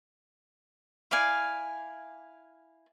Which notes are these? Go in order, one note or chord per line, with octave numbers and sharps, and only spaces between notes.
E4 D5 F5 G#5